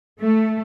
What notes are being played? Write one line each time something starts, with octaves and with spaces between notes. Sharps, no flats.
A3